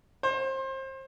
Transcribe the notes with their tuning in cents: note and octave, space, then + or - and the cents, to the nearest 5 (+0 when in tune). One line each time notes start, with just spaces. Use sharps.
C5 +30